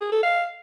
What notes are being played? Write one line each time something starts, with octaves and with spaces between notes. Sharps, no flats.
G#4
A4
F5